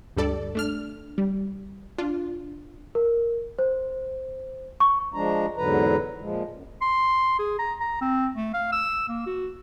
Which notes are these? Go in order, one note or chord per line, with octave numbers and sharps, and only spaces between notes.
D2 G2 G3 A4 D5
A3 D4 F6
G3
D4 F4
A#4
C5
C#6
F3 G#3 D4 A#5
E2 G#2 D3 F#3 B4 A#5
A#2 F3 G#3
F#2
C6
G#4
A#5
A#5
C4
A3
F5
E6
A#3
F#4